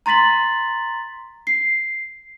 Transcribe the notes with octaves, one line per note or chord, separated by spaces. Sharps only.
A#5 C6 A6 B6 F#7
C7